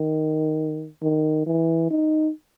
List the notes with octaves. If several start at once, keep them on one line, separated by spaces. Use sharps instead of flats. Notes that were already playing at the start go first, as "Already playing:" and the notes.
Already playing: D#3
D#3
E3
D#4